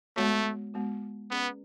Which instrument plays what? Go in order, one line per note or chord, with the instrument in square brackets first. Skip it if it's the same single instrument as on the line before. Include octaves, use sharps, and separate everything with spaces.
[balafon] G#3 B3 F#4 C#5 [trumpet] A3
[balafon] G#3 B3 F#4
[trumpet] B3 [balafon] C#4 G#4 B4 D5